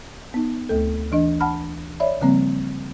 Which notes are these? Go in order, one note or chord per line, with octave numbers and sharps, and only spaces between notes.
B3 D#4
D2 A3 A4
E3 D4 D#5
F#5 A5 B5 F6
C#5 D5 E5 B5
C#3 F3 G3 A#3 C4